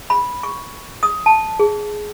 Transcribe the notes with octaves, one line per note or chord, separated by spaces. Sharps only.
B5
C#6
D#6
A5
G#4